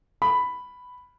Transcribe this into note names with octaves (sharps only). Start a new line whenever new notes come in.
B5